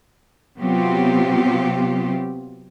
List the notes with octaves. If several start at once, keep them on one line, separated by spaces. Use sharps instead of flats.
C3 F#3 B3 C4 F4 G4